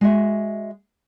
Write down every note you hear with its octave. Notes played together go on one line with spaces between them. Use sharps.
G#3 F#4 E5